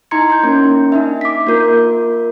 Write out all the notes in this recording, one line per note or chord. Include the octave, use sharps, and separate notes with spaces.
D#4 E4 A#5 C6 G#6 C#7
C6 G6
A#3 C#4 A#4
D4 D#4 E5
D6 B6
A#3 F4 A#4 G6